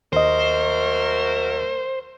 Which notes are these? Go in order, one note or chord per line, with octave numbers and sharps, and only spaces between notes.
D#2 F#3 A3 A#4 C5 D#5